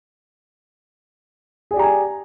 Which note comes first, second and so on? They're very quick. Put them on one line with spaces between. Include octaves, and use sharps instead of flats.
G#4 D5 G4 A#5 G#5